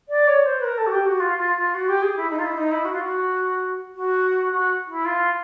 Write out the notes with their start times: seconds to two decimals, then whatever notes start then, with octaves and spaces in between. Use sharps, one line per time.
0.09 D5
0.27 C#5
0.45 C5
0.60 B4
0.64 A#4
0.78 A4
0.87 F#4
0.92 G4
1.05 F#4
1.20 F4
1.38 F4
1.56 F4
1.74 F#4
1.88 G4
2.02 G#4
2.16 E4
2.30 D#4
2.39 F4
2.44 E4
2.57 D#4
2.71 E4
2.85 F#4
2.93 F4
3.01 F#4
3.95 F#4
4.50 F#4
4.87 E4
5.05 F4